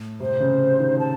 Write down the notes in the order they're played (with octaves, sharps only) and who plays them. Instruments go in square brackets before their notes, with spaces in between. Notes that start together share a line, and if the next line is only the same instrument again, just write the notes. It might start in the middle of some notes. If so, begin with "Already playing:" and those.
Already playing: [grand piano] A2
[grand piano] C3 [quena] C5
[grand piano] C#3
D#3
[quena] A5